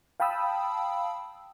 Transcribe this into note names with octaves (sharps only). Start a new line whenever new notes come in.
F5 G5 A5 B5 D#6 E6